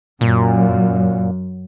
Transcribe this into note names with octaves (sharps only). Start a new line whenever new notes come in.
F#2 A#2